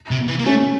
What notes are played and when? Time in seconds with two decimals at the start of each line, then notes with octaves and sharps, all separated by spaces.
0.11 C3
0.28 E3
0.39 A#3
0.46 A3 C#4